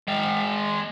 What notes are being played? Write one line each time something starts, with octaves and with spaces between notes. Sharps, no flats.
G#3 G5